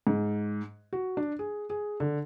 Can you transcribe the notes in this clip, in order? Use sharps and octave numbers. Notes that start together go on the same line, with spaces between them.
G#2
F#4
D4
G#4
G#4
D3